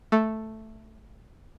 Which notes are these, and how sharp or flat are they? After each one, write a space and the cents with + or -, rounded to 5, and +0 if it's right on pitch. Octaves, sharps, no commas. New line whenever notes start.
A3 +0